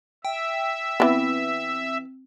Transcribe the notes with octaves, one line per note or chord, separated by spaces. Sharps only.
E5 G5
E3 B3 C4